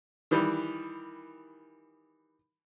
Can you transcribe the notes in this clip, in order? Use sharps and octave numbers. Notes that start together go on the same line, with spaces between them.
D#3 E3 G3